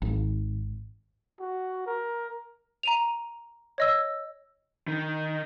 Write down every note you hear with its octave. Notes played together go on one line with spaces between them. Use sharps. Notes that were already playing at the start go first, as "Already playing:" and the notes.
G#1
F#4
A#4
A#5 D#7 F7
C#5 D#5 E6
D#3